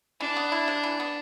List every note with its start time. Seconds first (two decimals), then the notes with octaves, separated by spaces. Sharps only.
0.20 E3 D4
0.37 B3
0.52 E4
0.68 C3
0.84 E3
1.00 B3